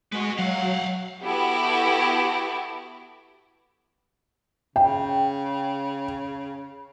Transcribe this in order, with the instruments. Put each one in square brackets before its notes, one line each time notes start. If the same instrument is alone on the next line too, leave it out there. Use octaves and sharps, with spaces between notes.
[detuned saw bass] G#3 [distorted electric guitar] F#4 B4
[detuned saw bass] F#3 [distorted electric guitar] F5 F#5
[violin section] B3 E4 F#4 G4 A4
[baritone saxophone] C#3 [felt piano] G5